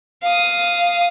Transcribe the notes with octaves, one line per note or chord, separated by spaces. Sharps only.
F5 D#6